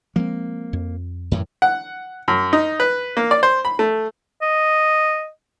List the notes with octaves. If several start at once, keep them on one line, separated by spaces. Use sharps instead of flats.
F3 G#3 A#3 C4
F2
F#2 A2 E3
F#5
F#2
D#4
B4
A#3
D5
C5
B5
A3
D#5